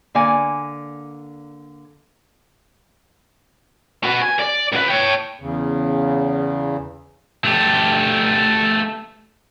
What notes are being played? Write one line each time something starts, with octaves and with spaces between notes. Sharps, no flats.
D3 A#3 D5 G#5
F#4 B4
G#5
D5
C#2 B4
C#5 G5
E2 C#3
A3 G4